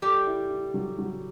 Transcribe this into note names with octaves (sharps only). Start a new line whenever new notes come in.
G3 G4 A4
E4
E4
F#3
F#3